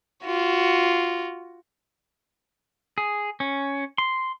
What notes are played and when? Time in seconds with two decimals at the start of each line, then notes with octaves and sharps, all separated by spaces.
0.24 F4 F#4
2.98 G#4
3.40 C#4
3.98 C6